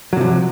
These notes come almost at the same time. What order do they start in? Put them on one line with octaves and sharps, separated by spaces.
F#3 C3 F3